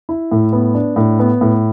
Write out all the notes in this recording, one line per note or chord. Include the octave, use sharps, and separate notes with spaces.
E4
A2
B3
D4
A2
B3
A2